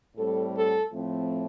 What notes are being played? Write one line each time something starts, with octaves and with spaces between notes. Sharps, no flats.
A2 G3 C4 A4
A4
A2 F3 A3 C4